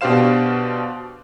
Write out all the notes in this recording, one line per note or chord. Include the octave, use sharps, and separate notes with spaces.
B2 D4 G4 C5 F5 E7